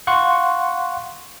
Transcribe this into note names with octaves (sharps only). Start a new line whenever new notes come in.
F5 F#5 C6 C#6 F#6